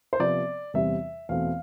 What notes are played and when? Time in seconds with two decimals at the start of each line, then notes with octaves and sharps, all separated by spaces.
0.13 C5
0.20 C3 F3 B3 D5
0.74 E2 C3 G3 C4 E5
1.29 E2 B2 A3 C4 F5